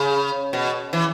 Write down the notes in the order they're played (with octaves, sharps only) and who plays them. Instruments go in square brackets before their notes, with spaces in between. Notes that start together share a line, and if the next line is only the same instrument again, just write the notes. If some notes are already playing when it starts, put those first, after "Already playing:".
Already playing: [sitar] C#3
B2
E3